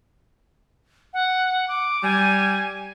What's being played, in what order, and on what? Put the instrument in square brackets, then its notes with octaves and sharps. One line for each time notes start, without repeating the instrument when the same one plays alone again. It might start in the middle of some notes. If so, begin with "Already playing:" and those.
[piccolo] F#5
D6
[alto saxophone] G3 [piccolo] G#5